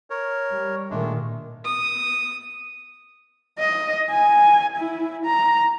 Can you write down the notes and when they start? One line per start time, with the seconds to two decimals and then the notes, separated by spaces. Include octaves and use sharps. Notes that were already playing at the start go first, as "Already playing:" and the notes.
0.10 A#4 C#5
0.51 G3
0.90 A#2 D#3 G#3 A3 D4
1.65 D#6
3.59 D#5
4.10 G#5
4.77 E4
5.25 A#5